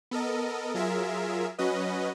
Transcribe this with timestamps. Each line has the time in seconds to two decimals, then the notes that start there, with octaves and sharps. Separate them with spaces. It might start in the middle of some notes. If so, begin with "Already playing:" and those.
0.11 B3 A4 A#4 D#5
0.74 F#3 F4 G#4 A#4 E5
1.58 F#3 C#4 F#4 B4 D#5